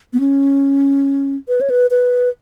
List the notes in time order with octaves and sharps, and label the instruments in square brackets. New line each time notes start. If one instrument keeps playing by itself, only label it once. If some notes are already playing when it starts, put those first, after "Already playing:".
[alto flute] B3
C#4
B4
C#5
B4
B4